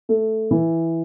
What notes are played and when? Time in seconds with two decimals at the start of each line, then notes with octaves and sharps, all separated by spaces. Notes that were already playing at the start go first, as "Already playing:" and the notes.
0.09 A3
0.51 E3